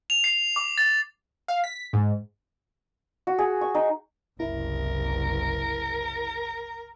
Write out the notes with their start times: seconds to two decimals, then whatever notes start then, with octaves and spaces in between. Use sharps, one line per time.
0.10 F7
0.24 C7
0.56 D6
0.78 A6
1.48 F5
1.64 B6
1.93 G#2
3.27 F#4
3.38 G#4
3.61 C#6
3.75 D#4
4.40 F#1 C2 E4 A#4